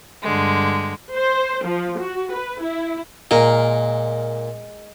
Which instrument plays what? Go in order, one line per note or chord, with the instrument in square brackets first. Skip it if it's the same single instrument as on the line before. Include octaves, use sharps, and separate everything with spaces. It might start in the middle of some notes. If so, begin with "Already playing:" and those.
[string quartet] G2 D3 G#3
[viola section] C5
F3
F#4
B4
E4
[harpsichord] A#2 [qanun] G#3 A#4 A#5